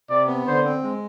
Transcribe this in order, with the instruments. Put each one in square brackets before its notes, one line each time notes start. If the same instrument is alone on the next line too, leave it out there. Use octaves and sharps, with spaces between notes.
[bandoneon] C3 [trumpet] D5
[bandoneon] B3
[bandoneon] D3 [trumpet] C5
[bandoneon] C4
G#3